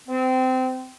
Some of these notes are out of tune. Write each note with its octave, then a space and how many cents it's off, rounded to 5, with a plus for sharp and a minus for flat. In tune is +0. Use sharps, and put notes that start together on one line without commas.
C4 -25